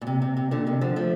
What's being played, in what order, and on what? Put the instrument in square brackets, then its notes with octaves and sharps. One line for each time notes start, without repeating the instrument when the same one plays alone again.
[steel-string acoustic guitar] A#2
C3
C3
C3
A#2 D3
C3 D#3
D3 F3
F3 A3